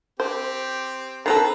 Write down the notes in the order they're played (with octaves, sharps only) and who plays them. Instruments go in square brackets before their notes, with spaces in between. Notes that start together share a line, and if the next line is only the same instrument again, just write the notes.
[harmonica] C4 G4 [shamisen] C5
[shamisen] D#3 C4 A4 [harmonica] B4 A#5